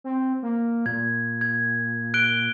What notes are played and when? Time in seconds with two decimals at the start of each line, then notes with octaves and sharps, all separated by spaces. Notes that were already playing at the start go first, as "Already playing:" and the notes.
0.04 C4
0.42 A#3
0.86 A#2 G#6
1.41 G#6
2.14 F#6 D7 G7